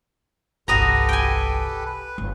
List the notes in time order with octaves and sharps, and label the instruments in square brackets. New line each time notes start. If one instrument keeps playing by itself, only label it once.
[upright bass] G1 C2 [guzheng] F#4 D#5 A#5 [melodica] G4 A4 B4
[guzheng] G5 G#5
[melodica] B4
[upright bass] G1